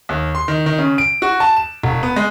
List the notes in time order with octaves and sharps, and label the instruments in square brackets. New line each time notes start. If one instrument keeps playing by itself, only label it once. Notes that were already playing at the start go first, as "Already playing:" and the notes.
[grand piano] D#2
C6
D#3
D#3
C#3
D7
F#4
A5
E7
E1
B3
G#3